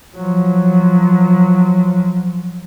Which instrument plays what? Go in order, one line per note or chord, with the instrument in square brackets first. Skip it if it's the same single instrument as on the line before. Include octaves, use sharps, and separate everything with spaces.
[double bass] F3 F#3